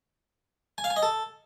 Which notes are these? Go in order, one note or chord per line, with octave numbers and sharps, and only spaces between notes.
G#5
F5
G#5
D#5
A4